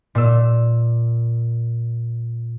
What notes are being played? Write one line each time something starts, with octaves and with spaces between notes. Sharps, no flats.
A#2 E6